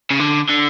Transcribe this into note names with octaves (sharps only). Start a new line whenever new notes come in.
C#3
D3
D3